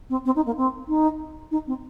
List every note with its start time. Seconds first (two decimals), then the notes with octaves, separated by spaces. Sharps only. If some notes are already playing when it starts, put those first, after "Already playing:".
0.09 C4
0.25 C4
0.35 D#4
0.46 A#3
0.57 C4
0.88 D#4
1.51 D#4
1.67 C4